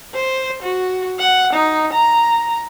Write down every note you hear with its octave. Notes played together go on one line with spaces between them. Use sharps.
C5
F#4
F#5
D#4
A#5